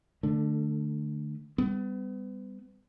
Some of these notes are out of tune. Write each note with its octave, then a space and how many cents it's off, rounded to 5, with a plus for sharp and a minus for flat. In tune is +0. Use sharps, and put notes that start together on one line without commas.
D3 +20 A3 +0
G3 +25 B3 +40